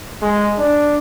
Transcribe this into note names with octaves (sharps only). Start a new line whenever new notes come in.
G#3
D4